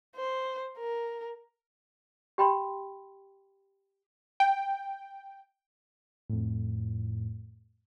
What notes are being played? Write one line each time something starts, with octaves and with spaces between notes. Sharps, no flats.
C5
A#4
G4 G5 B5 C6
G5
F2 A2